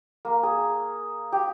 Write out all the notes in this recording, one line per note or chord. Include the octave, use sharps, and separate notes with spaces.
A#3
G#4
G4